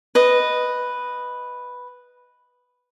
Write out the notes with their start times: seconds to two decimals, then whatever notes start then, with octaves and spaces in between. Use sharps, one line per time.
0.15 B4 D#5